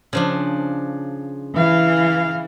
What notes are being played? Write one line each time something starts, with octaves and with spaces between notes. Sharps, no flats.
C#3 F3 D4
E3 F5